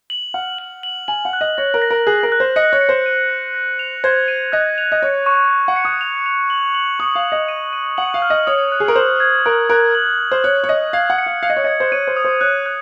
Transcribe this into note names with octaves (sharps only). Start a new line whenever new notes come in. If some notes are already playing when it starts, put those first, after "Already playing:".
F#7
F#5 F6
F#7
F#7
G#5 F#7
F#5
F#6
D#5
C#5 A#6
A#4
A#6
A#4
G#4 F#6
A#4
F#6
C5
D#5 C#7
C#5
C#7
C5
D#7
A#6
A#6
F7
C5 G#6
D#7
D#5 F#6
F7
D#5
C#5 C#6
C#6
F#6
F#5
C#7
D#6
F7
F7
F#7
F#7
C#6 D#6
F5
D#6
D#5
D#7
D#7
F#5 F#7
F5
F6
D#5
C#5 D#6
F#6
G#4
A#4
C5 F#7
G#6
A#4 F#6
A#4 F#6
F#7
G#6
C5
C#5 F#6
C#5
D#5 F#6
F5 G#6
F#5
C#7
F5
F5 C#7
D#5
C#5
D#5 G#6
C5
C#5 D#7
C5
D#6
C5
C#5 F#6
F#6